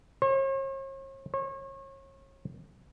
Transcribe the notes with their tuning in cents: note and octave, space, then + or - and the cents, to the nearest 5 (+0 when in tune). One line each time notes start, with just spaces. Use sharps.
C#5 -45
C#5 -35